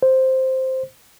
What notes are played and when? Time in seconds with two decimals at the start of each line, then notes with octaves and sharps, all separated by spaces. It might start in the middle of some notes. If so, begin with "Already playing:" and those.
0.03 C5